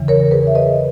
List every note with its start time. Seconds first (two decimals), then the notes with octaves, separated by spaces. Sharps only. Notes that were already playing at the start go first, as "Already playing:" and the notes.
Already playing: E2 C#3 E3
0.08 A#4 C#5
0.31 G#4 B4
0.47 E5
0.55 B4 D#5